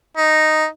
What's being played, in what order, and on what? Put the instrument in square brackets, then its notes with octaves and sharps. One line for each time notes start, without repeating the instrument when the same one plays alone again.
[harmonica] D#4